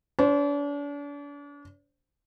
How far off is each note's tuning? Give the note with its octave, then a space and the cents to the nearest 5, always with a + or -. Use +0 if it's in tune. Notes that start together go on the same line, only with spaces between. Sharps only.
D4 -40 C5 +0